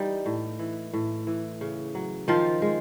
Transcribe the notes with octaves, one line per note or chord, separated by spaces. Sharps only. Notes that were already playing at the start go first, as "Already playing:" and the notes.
Already playing: E3 G3 D#4
A2
E3
A2
E3
C#3
F#3
D#3 F3 F4
G#3